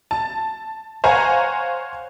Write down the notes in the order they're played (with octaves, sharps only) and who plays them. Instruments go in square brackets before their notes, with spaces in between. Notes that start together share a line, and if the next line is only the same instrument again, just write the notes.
[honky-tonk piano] A5
C5 C#5 F5 F#5 G#5 A#5